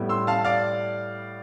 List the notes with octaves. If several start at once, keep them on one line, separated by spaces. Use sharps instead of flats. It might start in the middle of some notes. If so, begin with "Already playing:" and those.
Already playing: A2 G3 B3
C6 E6
F5 A5
D5 F5